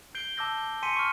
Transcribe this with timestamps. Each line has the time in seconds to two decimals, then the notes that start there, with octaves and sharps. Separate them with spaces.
0.15 G6 C7 D7 G7
0.37 A5 D6 E6 G6 A#6
0.58 G6
0.83 G#5 C6 B6 C#7 D#7
0.96 C#6 F6